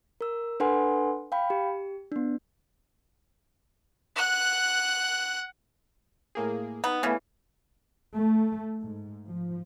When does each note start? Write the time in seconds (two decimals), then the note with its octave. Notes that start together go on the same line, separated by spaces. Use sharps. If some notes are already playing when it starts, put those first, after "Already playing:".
0.21 A#4 E6
0.60 D4 A4 B4 F#5 G#5 C6
1.32 F5 G5 B5
1.50 G4
2.12 B3 D4
4.16 F#5 F#6
6.35 A2 A#3 G#4
6.84 B3 D#4
7.03 C#3 E3 A3 B3
8.13 A3
8.79 G#2
9.25 F3